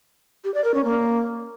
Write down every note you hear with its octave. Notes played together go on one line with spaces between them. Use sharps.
G4
D5
A#4
C#4
A#3